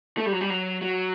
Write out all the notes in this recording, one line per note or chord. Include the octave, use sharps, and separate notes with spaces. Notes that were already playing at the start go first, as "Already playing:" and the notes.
A3
G3
F#3
G3
F#3
F#3